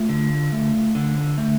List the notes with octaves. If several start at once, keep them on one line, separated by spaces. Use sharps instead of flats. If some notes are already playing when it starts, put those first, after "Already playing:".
Already playing: A3 F4
D3
A3
D3
A3